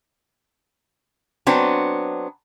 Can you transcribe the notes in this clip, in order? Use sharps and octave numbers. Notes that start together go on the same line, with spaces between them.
F#3 B3 C4 D4